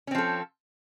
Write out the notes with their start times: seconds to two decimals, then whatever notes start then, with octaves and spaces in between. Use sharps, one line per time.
0.07 C#4
0.11 C4
0.15 F3
0.18 A4